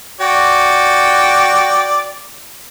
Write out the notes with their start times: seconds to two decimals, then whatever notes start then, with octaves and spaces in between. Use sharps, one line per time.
0.21 F#4 D5 G5